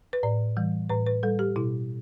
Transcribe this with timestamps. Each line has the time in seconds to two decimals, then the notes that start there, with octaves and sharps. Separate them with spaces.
0.13 B4
0.23 A2 D5
0.57 E3 G3
0.89 A2 B4
1.07 B4
1.23 G3 A4
1.39 G4
1.56 B2 E4